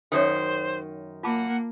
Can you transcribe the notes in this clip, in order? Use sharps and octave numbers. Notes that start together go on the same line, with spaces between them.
F#2 D#3 F#4 G4 C5 C#5
A#3 F4 F#5 A5 D6